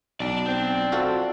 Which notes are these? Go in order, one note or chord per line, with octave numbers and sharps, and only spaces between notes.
B1 D5 A5
C4
F4 F#4 A4